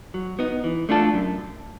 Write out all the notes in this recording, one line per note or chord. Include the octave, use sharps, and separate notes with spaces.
F#3
B3 D#4
E3
A3 D4 F4 A4
F#2